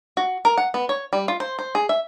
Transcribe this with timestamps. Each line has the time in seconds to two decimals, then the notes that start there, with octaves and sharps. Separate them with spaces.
0.17 F#4
0.45 A#4
0.58 F#5
0.74 B3
0.89 C#5
1.13 G3
1.28 F4
1.40 C5
1.59 C5
1.75 G#4
1.89 E5